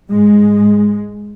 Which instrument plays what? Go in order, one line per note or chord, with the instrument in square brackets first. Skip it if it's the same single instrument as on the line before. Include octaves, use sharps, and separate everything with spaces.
[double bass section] G#2 G#3